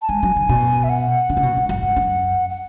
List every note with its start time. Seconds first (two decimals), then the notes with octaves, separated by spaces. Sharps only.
0.02 A5
0.09 G#3 G#5
0.23 F#3
0.36 D3
0.49 B2
0.84 E5
0.89 F#5
1.29 D3
1.37 C#3
1.43 B2
1.57 G#2
1.69 F#2 F#5
1.83 G#2
1.96 F#2
2.50 F#5